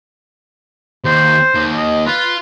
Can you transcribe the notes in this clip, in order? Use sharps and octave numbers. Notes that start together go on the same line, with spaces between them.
D#2 C5
D#2
D#5
F4 B4